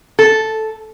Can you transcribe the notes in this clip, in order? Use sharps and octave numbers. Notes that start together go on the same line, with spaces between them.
A4